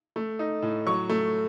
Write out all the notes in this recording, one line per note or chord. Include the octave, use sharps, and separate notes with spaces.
A3
D#4
A2
F#3 C#6
A3